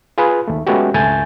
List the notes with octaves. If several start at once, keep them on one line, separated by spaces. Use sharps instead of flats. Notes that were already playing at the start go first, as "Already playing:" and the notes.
F4 G#4 B4
D#2 A3
G#3 A3 B3 C#4 F#4 G4
C#2 G2 A3 G#5 G6 A6